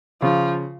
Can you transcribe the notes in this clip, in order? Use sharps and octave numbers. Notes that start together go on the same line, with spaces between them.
C#3 F3